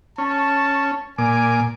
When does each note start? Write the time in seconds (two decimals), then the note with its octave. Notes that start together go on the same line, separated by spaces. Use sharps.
0.18 C#4 A5
1.18 A#2 G#5 D6